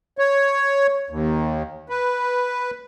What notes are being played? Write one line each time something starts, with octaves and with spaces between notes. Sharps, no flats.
C#5
D#2
B4